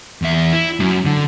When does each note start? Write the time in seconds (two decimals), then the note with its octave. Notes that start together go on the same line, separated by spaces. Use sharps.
0.22 E2 E5
0.53 E4
0.80 F#2 F#3
1.05 D3